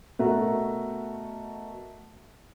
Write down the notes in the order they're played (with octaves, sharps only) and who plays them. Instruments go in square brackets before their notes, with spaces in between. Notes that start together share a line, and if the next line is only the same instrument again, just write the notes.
[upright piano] B2 A3 F#4 A#4 A#5